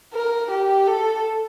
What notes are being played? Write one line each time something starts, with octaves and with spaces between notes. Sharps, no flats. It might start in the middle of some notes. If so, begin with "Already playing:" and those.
A#4
G4
A4